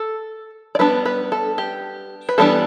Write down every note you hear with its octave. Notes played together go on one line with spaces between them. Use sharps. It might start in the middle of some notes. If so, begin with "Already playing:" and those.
Already playing: A4
D5
G3 B3 D4 B4
B4
A4
G4
B4
E3 G3 B3 D4 A4